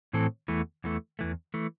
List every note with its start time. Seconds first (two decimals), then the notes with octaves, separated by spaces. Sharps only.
0.13 A2 E3 C4 A4
0.48 E2 E3 A3
0.84 E2 E3 A3
1.19 E2 E3 A3
1.54 E3 A3